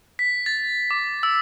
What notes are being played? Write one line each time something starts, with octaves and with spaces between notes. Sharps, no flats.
B6
A6
D6
E6